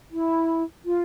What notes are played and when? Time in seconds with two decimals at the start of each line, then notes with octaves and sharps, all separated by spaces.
0.11 E4
0.85 F4